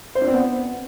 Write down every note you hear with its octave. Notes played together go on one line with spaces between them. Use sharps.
C5
D4
C4
B3